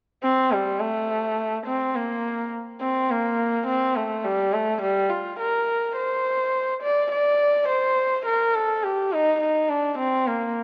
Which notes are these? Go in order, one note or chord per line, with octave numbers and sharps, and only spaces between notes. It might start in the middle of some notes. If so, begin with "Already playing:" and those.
C4
G3
A3
C4
A#3
C4
A#3
C4
A3
G3
A3
G3
F4
A#4
C5
D5
D5
C5
A#4
A4
G4
D#4
D#4
D4
C4
A#3